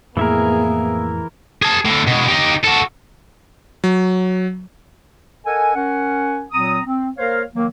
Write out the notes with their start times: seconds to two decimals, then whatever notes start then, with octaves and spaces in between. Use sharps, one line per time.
0.17 F2 A2 E3 A#3 B3 E4 G#4 A#4
1.62 G#4 A5
1.85 A2 D3
2.07 B2 G#3
2.28 D#4 G4
2.64 F#4 A4
3.84 F#3
5.46 A4 A#4 D#5 F#5 G#5
5.75 C#4 A#4 F#5 G#5
6.52 A#2 F#3 C4 A#5 D#6
6.85 C4
7.18 A#3 A#4 C5 C#5 F5
7.55 D#3 F#3 A#3